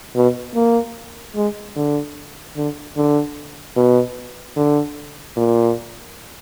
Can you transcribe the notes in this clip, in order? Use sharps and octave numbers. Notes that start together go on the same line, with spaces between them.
B2
A#3
G#3
D3
D3
D3
B2
D3
A#2